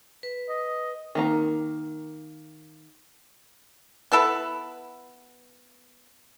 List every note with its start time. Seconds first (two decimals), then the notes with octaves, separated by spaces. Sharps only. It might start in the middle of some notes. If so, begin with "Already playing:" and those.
0.23 B4
0.49 D#5
1.15 D#3 A#3 A#5
4.12 B3 E4 A4 B4